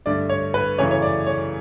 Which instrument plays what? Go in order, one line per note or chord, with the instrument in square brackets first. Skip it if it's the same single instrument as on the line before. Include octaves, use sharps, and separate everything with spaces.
[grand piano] G2 D3 A3 D5
C#5
B4
F#2 C#3 E3 A3 C#5
C#5
D5
C#5